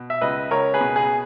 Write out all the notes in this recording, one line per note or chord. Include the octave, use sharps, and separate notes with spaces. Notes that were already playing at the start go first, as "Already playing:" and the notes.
Already playing: B2
E5
C#2 B4 D#5
C#2 A#4 C#5
G#4 B4
B2
G#4